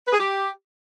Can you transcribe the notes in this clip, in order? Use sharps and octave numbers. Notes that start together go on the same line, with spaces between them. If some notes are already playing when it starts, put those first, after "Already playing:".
B4
G#4
G4